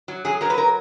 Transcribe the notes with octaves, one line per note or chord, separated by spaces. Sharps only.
F#3
F#3 G#4
F#3 A#4
B4
A#4